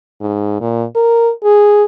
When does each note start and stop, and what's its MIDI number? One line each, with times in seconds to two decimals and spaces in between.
0.20 0.60 44
0.61 0.85 46
0.96 1.31 70
1.44 1.84 68